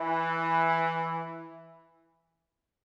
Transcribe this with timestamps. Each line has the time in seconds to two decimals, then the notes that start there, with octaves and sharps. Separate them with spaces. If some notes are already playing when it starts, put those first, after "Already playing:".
Already playing: E3